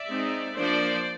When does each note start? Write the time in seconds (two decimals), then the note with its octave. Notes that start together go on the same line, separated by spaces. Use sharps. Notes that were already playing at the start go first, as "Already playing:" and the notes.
Already playing: D5 E5
0.08 G#3 C4 D#4
0.55 F3 A#3 D4 C5 D5